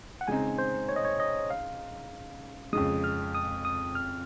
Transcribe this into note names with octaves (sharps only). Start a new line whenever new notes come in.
F#5
C#3 G#3 C4 D#4 G#5
C5
C#5
D#5
C#5
D#5
F5
F2 C#3 G#3 D#6
F6
D#6
D#6
F6